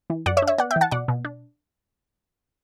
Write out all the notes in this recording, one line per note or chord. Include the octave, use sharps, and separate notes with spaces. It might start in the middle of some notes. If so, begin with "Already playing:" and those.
E3
F#2 D5 F#5
C#5 E5
D4
C#5 E5
B3 D5 F#5
E5 G5
E3
F#5 A5
B2 D5 F#5
B2
D4